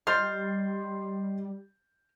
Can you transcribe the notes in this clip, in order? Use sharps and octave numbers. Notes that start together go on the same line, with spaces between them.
G3 D#5 C6 F6 G6 A6 C7